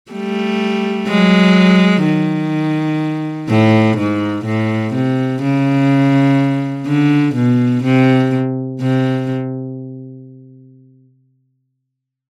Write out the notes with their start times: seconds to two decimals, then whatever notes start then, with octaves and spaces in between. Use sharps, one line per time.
0.12 G3 A3
1.08 F#3 G#3
2.04 D#3
3.49 A2
3.98 G#2
4.45 A2
4.94 C3
5.42 C#3
6.87 D3
7.35 B2
7.84 C3
8.81 C3